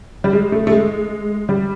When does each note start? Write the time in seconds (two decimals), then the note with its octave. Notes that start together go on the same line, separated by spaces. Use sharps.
0.24 G3
0.33 G#3
0.52 A3
0.67 A3
0.72 G#3
1.49 G3